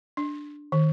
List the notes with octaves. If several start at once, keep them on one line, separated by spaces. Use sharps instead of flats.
D4
D#3